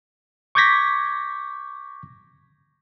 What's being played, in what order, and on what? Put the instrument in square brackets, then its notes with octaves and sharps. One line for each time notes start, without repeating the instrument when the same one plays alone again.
[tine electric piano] C#6 D6 G6 G#6 A#6 B6